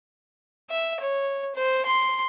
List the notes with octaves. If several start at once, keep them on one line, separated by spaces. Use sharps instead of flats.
E5
C#5
C5
C6